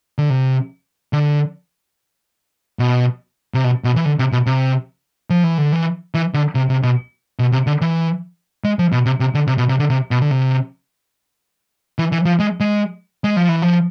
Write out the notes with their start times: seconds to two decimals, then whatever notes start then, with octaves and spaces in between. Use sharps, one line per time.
0.18 D3
0.30 C3
1.13 D3
2.79 B2
3.54 C3
3.64 B2
3.84 B2
3.96 E3
4.05 D3
4.19 C3
4.32 B2
4.46 C3
5.30 F3
5.44 E3
5.58 D3
5.72 E3
6.14 E3
6.34 D3
6.55 C3
6.69 C3
6.83 B2
7.39 B2
7.52 C3
7.67 D3
7.81 E3
8.64 G#3
8.79 F3
8.92 B2
9.06 C3
9.20 C3
9.35 D3
9.47 C3
9.58 B2
9.69 C3
9.79 D3
9.90 C3
10.11 B2
10.21 D3
10.31 C3
11.99 E3
12.12 E3
12.26 F3
12.39 G#3
12.60 G#3
13.24 G#3
13.37 F3
13.49 E3
13.62 F3